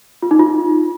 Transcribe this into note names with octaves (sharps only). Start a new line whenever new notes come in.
F4
D#4
F4